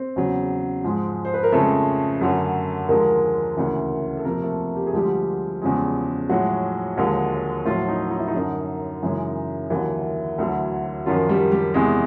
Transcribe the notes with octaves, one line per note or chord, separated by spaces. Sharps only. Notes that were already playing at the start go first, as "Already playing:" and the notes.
Already playing: C4 C5
E2 C#3 F#3
G#2 F3 G#3
C5
B4
A#4
F2 C#3 F3 G#3 A3 A4
F#2 D3 F#3
D#2 D3 F3 G#3 A#3 A#4
D2 C#3 E3
A4
F2 C3 F3 A#3 A#4
A3 A4
G4
G#4
D2 D3 F3 G3 G#3 G4
E2 C#3 F3 G#3
A2 F3 F#3 G#3 F#4
D#2 D3 F3 G#3
A2 F3 F#3 F4
D#4
D#4
E4
D#4
F#2 D3 F#3
F#2 C#3 E3 G#3
D#2 D3 E3 F#3 E4
D2 D3 F#3
F#2 D#3 F3 F#3 F4
G3 G4
G3 G4
E2 C3 E3 G#3 G#4